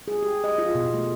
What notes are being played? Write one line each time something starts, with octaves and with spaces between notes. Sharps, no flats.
G#4
G4
D#5
F4
B2
A3